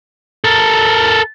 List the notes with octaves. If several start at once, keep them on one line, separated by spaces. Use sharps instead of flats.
A4 A#4